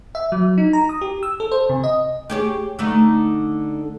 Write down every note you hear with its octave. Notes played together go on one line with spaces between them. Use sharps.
E5
F#3
D#4
A#5
D#6
G4
E6
A4
C5
C3
D#5
G4 G#4 C#5
D3 A3 D#4